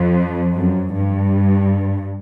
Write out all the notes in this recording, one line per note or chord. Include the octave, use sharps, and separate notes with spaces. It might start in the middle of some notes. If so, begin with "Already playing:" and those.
Already playing: F2
F#2
G2